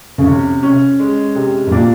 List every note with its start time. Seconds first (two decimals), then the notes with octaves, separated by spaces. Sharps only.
0.18 C#3
0.26 C3 C#4
0.63 C#4
0.99 G#3
1.35 C3
1.67 B2
1.71 A#2 D4